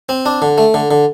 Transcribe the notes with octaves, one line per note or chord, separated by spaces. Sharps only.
C4
D4
D3
A3
D3
D3